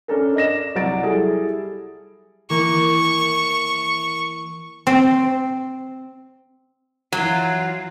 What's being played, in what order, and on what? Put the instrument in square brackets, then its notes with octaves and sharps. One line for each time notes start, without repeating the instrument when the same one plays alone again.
[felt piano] C#4 D4 A4 A#4
D5 D#5 A#6 E7
C2 F#3 C#5 D5 A6 D7
G3 E4 G#4 A4
[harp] E3 A#3 [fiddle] C#6
[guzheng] C4
[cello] E3 F4 [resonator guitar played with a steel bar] F#3